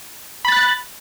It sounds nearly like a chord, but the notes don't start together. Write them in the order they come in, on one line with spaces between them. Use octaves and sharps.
B5 A6 F#6